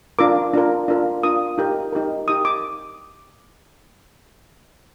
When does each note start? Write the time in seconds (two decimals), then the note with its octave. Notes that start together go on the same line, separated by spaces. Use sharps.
0.19 D4 F4 A#4 D6
0.54 D4 F4 A#4
0.88 D4 F4 A#4
1.23 D4 F4 A#4 D#6
1.58 D#4 G4 A#4
1.93 D#4 G4 A#4
2.28 D#4 G4 A#4 D#6
2.45 D6